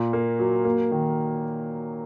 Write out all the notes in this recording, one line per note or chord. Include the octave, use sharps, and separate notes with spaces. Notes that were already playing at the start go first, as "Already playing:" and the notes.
Already playing: A#2
A#3
F#3
A#3
D#3